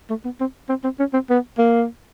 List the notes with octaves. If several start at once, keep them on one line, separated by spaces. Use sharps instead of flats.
A3
B3
C4
C4
C4
C#4
C4
B3
A#3